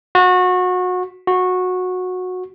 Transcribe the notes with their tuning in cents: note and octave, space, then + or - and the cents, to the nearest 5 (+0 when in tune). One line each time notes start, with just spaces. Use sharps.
F#4 -25
F#4 -15